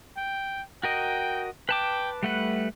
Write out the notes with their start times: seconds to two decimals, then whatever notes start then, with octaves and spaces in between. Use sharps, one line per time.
0.17 G5
0.83 F#4 A#4 D#5 G5
1.69 B4 G5 A5 D6
2.23 G3 A3 B4 F#5